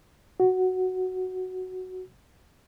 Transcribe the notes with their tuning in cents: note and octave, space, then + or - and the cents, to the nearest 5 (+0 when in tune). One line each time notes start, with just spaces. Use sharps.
F#4 +0